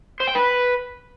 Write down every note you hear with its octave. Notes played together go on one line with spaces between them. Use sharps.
C5
G5
B4